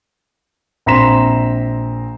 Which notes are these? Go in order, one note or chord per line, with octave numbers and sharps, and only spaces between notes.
A#1 C4 A#5 C6 B6 E7